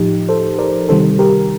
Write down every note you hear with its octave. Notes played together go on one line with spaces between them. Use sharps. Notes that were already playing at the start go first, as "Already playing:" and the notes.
Already playing: A2 F3 D#4 G4
A4 C5
A#4 D5
C3 D#3 G3 A4 C5
G4 A#4